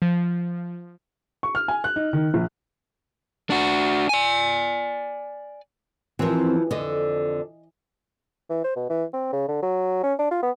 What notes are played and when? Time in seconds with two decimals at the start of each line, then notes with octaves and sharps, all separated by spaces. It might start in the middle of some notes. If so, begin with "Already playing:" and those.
0.02 F3
1.43 C#6
1.55 F6
1.68 G#5
1.84 F#6
1.96 D#4
2.13 D#3
2.34 A#1
3.50 D4 F#4
4.09 D5 G#5
6.19 E3 F3 C4 G4 A#4
6.71 F2 D3 D#5
8.50 E3
8.64 C5
8.76 B2
8.90 E3
9.14 C4
9.33 C#3
9.48 D3
9.62 F#3
10.03 C#4
10.19 D4
10.31 F4
10.43 B3